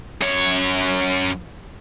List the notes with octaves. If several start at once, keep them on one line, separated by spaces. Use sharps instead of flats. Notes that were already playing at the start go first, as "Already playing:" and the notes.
F#2 C#5